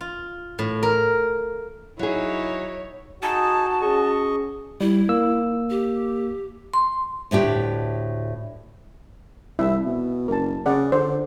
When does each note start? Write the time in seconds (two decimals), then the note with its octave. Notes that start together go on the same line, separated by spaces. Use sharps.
0.01 F4
0.59 A2
0.83 A#4
1.99 F#3 D#4 E4 G#4 C#5
3.23 D#4 F#4 G#4 A5
3.82 C#4 G#4 D#5 C#6
4.81 G3 E4
5.09 A#3 E6
5.70 G4
6.74 C6
7.31 D2 A2 D4 G4
9.59 C2 E4 E5
9.86 B2
10.28 F#1 A#4 A5
10.66 C#3 D5 F#5
10.92 D3 C5